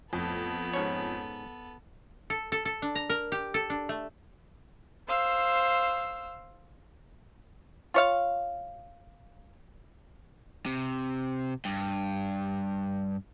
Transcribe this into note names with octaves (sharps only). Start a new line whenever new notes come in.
F2 A2 B3 A4
G#2 C#4 C#5
A4
A4
A4
D4
A#5
A#4
G4
A4
D4
A3
C5 F5 E6
F4 C#5 F5
C3
G2